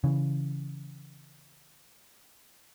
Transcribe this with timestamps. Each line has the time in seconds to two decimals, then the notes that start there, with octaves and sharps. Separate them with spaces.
0.04 C#3 E3